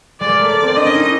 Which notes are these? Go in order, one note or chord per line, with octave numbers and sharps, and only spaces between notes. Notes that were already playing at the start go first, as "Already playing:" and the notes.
G#3 D5
A#3
A3
A#3 D5
C4
D4 D#5
C#4
D#4
E4